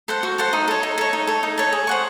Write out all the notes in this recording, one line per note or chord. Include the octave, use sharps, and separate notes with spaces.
A4 C5 F#5
F#4
A4 C5 F#5
D#4
A4 C#5
D#4
A4 C#5
D#4
A4 C#5
D#4
A4 C#5
G#4
C5 F#5 C#6